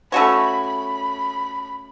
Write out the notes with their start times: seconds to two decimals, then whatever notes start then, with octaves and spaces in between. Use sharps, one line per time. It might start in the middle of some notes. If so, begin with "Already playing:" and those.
0.12 A3 C#4 F#4 C#5 B5
0.68 B5